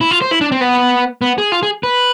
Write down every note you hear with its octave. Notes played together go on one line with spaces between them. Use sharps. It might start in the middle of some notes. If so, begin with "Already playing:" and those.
E4
F4
C5
E4
D4
C4
B3
B3
G#4
F4
G#4
B4